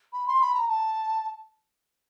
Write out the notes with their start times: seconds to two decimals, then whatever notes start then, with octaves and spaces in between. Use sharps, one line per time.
0.13 B5
0.27 C6
0.41 B5
0.54 A#5
0.68 A5